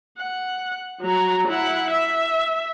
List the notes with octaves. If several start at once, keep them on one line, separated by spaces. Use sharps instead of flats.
F#5
F#3 A#5
E4 F#5
E5